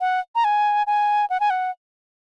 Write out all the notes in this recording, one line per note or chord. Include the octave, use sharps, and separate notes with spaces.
F#5
A#5
G#5
G#5
F#5
G#5
F#5